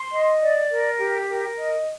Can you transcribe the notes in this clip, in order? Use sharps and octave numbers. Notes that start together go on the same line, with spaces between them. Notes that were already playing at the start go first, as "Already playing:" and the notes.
Already playing: C6
D#5
D5
A#4
G4
A#4
D#5